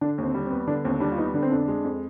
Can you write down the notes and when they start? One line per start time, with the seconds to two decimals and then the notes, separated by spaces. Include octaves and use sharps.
0.01 D3 D4
0.18 D#2 C4
0.35 G3
0.46 C4
0.51 B3
0.67 D3 D4
0.85 D#2 C4
1.00 G3 D4
1.12 F4
1.18 B3 D#4
1.34 D3 D4
1.42 C4
1.51 F2 D4
1.68 G#3
1.84 F2